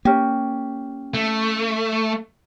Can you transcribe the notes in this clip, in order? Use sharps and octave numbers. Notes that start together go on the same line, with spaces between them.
A#3 C#4 G4
A3